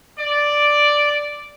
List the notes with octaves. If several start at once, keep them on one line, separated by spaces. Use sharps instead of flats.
D5